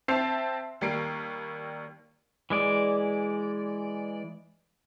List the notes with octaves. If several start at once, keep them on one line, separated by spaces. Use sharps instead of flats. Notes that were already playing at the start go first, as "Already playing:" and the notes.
C4 C5 E5 A5 C7 F7
D#2 G3 A#3 C7 D7
E3 G#3 D5